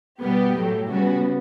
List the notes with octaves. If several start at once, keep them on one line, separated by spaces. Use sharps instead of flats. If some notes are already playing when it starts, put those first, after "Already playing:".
B2 G3 B3 G4
A2 F#3 A3
C#3 G3 B3 F#4